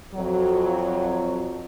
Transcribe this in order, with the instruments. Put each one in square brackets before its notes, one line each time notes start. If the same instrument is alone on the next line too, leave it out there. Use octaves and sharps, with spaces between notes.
[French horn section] F2 F#3